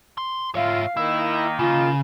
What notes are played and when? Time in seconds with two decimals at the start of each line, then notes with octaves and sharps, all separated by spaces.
0.18 C6
0.55 F4 C#5 E5 F5
0.97 D#3 A#3 D#4 E4
1.59 C#3 F4